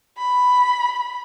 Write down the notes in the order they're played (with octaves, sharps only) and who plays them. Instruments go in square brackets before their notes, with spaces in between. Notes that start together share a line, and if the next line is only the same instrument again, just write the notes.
[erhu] B5